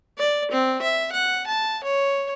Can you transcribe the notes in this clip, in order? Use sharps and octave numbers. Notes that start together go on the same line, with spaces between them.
D5
C4
E5
F#5
A5
C#5